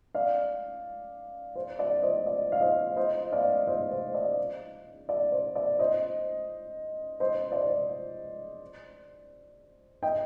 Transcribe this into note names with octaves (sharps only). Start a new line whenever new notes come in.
D5 F5
C5
D5
C5 D#5
D5
F5
C5 D#5
C5 D#5
D5 F5
C5 D#5
C5
D5
D5
C5
D5
C5 D#5
C5 D#5
D5
C5
D#5 G5